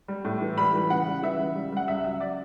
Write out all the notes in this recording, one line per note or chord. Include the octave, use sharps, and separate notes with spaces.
G3
A2
E3
G3 B5
E3
C#3 F#5
G3
E3 E5
C#3
G3
G3 F#5
C#2 E5
F#3 E5
F#3 D5